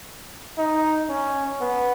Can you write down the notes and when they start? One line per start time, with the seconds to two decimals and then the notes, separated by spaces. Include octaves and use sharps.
0.58 D#4
1.09 C#4
1.62 B3